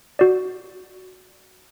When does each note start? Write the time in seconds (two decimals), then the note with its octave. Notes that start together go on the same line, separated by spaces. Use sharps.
0.19 F#4 D5